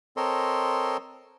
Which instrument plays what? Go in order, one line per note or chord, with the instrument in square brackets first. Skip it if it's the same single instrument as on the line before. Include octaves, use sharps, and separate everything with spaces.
[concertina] C4 A4 A#4 C#5 D#5 C6